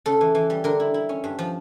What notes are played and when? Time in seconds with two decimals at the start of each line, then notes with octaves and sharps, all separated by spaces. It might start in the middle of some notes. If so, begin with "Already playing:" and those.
0.06 C#3 A4
0.21 E3
0.35 E3
0.50 G3
0.64 D3 A#4
0.80 E4
0.94 E4
1.09 C#4
1.24 G2
1.39 F3